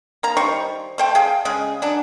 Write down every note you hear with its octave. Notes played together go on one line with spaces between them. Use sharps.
A#3 A#5
D#3 G3 C5 C#6
A3 C5 G5
G#4 F5 G5
C#3 G#3 G#4
F#3 D4